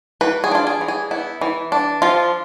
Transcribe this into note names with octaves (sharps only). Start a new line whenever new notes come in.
E3 B4
G#4
D4 F4
G#4
E3
G#4
B3 E4
E3
D4
F3 F4